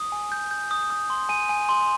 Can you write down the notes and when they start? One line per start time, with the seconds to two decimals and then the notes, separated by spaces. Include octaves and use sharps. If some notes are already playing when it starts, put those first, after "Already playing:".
Already playing: D#6
0.12 G#5
0.32 G6
0.51 G6
0.71 D#6
0.90 D#6
1.10 C6
1.29 G#5 D#7
1.49 G#5
1.69 C6